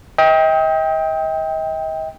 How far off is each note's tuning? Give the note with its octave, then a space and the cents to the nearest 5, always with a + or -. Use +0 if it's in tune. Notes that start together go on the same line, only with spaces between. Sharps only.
D#5 +40 G5 +10